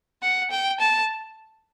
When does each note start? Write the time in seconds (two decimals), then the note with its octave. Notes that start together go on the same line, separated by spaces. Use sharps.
0.22 F#5
0.51 G5
0.80 A5